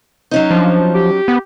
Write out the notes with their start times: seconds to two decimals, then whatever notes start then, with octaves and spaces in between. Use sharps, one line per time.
0.31 F#3 C#4 D#4
0.51 F3 D4
0.95 G4
1.28 B3